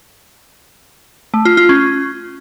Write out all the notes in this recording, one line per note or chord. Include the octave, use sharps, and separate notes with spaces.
A3
F4
F4
C#4